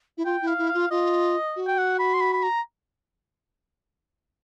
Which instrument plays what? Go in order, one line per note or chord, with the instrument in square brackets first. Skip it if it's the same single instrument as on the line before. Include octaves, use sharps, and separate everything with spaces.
[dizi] E4
[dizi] F4 [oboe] G5
[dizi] E4
[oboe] F5
[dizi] E4
[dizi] F4 [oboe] F5
[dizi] F4 [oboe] D#5
[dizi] F#4
[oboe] G5
F#5
B5
C6
B5
B5
A#5